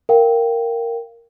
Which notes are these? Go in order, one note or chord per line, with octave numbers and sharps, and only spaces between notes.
A#4 F5 G5